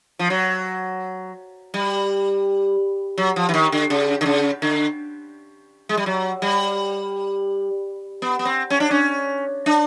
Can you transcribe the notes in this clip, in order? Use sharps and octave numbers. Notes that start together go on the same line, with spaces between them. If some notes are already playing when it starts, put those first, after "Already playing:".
F3
F#3
G3
F#3
F3
E3
D#3
D3
C#3
D3
C#3
D3
G#3
G3
F#3
G3
B3
B3
C4
C#4
D4
C#4
D4